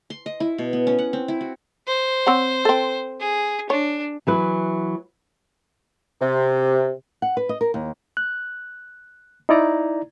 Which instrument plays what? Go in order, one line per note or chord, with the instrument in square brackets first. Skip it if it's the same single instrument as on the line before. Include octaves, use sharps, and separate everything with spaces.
[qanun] C6
D#5
E4
B2
B3
C#4
F#5
C4
E4
F#4
[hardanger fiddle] C5
[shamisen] C4 C#5 F#5
C4 A4
[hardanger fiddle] G#4
[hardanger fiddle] D4 [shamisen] C#5
[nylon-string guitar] E3 F#3 B4
[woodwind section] C3
[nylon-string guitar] F#5
B4
D#5
A#4
D#2
[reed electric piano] F#6
D#4 E4 D5 A#5